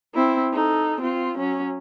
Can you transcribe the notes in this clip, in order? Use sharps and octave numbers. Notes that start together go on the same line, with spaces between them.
C4 E4
D#4 A4
C4 F4
F#3 C#4